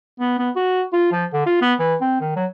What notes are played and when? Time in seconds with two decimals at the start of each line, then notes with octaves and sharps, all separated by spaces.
0.20 B3
0.39 B3
0.56 F#4
0.93 F4
1.12 F3
1.33 D3
1.46 F4
1.61 B3
1.79 E3
2.01 C4
2.21 D#3
2.36 F#3